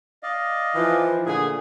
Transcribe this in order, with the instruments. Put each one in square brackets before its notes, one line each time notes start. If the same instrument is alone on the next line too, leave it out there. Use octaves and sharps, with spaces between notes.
[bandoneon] D5 D#5 F5
[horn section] E3 F3
[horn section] A#2 D3 G#4 [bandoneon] A3